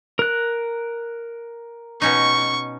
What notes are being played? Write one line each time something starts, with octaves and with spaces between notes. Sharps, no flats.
A#4 F#6
B2 C#4 D#4 C#6